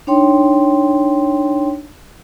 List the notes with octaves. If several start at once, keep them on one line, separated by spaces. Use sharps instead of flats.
D4 D#4 C#5 G5 C6